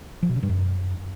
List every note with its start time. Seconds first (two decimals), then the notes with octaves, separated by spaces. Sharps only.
0.23 F3
0.29 B2
0.36 C#3
0.43 G2
0.49 F#2